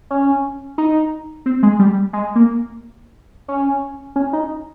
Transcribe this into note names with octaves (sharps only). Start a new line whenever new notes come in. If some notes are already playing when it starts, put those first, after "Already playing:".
C#4
D#4
C4
G#3
G3
G#3
A#3
C#4
C#4
D#4